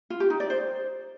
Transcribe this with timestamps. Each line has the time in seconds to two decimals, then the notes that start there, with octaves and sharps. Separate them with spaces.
0.10 F4
0.20 G4
0.30 D#4
0.40 D5
0.50 C5